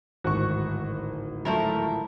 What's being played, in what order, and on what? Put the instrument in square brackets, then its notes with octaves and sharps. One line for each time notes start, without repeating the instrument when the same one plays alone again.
[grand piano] D1 G#1 [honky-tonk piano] F#4 C#6
[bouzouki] F3 E4 A#4 [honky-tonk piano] F#3 A3